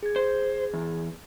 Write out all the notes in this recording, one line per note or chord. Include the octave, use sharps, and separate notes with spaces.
G#4 G#6
C5
E2